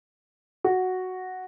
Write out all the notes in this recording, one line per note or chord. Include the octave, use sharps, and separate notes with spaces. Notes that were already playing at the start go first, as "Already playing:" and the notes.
F#4